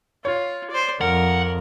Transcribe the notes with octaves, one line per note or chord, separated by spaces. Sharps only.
F4 C#5
C5 D5
F2 A#4 F#5